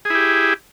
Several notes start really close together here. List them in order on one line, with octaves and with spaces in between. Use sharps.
G#4 E4 G4